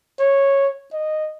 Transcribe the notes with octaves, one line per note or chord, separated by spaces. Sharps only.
C#5
D#5